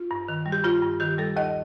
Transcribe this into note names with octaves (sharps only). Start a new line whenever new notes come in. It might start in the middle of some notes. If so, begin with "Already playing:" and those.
Already playing: F4
G2
D#3
G3
G4
G2 F4
G2
D#3 G4
G3 A4
D#2 D#5